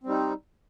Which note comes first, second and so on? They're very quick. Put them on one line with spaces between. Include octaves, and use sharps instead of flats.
C4 G3 D#4